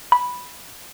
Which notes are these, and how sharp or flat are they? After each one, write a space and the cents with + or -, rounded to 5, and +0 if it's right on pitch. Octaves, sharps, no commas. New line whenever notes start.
B5 -5